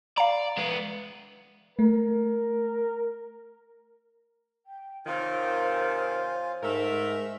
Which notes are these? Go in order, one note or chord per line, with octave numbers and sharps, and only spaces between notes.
D5 F5 A#5
G#3 B3
A3 A#4
G5
C3 D#3 F4 C5 C#5 G#5
G#2 A3 A4 A#4 E5